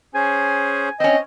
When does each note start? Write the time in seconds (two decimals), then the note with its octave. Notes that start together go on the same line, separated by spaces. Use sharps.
0.15 C#4 G#4 C5 G#5
1.00 C4 C#4 D#5